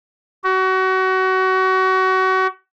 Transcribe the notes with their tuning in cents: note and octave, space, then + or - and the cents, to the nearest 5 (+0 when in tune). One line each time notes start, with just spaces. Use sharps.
F#4 +25